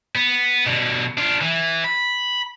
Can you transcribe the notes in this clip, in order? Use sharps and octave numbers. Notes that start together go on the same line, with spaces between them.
B3
B2 D3
D4 F4
E3
B5